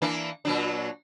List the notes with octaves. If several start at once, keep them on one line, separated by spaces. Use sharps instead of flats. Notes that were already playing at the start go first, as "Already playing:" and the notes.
E3 A#3 D4
A#2 F#3 D4